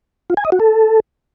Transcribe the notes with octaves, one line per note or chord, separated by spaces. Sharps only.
F4
G#5
D#5
F#4
A4